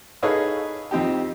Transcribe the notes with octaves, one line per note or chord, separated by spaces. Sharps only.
D#4 G#4 A4 B4 C#5 F5
F2 C4 D#4 G4